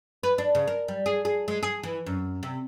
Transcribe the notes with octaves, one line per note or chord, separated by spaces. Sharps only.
B4
D4
C#3
A#4
G3
G#4
G#4
G#3
G#4
E3
F#2
C3